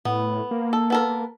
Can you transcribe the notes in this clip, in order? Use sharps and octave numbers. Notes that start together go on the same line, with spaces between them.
A2 B3
A#3
A4
B3 A4 A#4